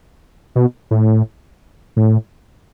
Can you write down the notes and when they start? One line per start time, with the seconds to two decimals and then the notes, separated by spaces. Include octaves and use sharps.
0.55 B2
0.91 A2
1.96 A2